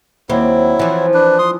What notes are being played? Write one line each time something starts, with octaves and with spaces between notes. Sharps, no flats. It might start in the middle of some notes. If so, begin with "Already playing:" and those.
D#2 F#3 C4 E4
E3 F3
D4 B4
C6 D#6